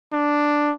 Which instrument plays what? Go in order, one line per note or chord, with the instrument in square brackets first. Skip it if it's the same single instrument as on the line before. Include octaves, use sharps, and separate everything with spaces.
[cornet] D4